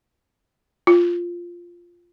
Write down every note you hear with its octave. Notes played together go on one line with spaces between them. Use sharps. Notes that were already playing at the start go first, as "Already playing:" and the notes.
F4